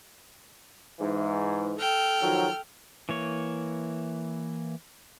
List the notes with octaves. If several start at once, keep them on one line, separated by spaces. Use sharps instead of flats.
G#2 E3
A4 G5 F6
D#3 F3 F#3
E3 A#3 C#5